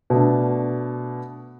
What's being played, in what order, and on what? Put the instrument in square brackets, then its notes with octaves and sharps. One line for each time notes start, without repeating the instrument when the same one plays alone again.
[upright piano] B2 A3 D4